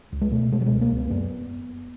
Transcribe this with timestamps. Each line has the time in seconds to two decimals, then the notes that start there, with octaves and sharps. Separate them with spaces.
0.12 C#2
0.21 G#3
0.31 B2 A3
0.52 B2 G#3
0.61 G3
0.66 G#3
0.72 C#2
0.81 A#3
0.91 C#2
0.97 B3
1.10 F#2 B3